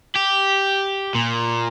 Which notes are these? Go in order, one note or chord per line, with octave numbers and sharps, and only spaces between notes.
G4
A#2